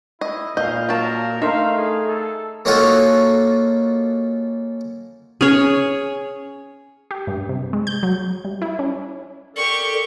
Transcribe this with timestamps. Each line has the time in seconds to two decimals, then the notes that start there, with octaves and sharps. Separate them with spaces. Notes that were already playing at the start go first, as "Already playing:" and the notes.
0.21 E4 D#5
0.57 A#2 D#5 F5 G6
0.89 F#3 A#4 A5
1.42 A3 D#4 A#4 E5 F5 C6
1.78 G#4
2.08 A4
2.65 A#3 C#4 D#4 F4 F#4 A4
5.41 C#4 G#4 C#5
7.11 G4
7.27 G2
7.49 C3
7.73 G#3
7.87 G6
8.03 F#3
8.45 G3
8.62 E4
8.79 C#4
9.56 G4 A4 A#4 D5 C#6